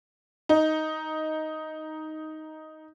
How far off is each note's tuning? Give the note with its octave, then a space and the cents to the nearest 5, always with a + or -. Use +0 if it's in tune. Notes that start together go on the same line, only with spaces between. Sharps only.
D#4 +5